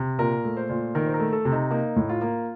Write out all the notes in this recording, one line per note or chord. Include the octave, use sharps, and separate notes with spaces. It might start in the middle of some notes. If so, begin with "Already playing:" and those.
Already playing: C3
A#2 A#4
A3
C5
A#2
D#3 A#4
C5
A#4
A3
A4
C3
D#4
A#3 D#4
A2
F4
A#3